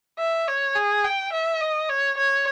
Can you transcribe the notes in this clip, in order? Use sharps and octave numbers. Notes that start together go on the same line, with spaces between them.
E5
C#5
G#4
G5
E5
D#5
C#5
C#5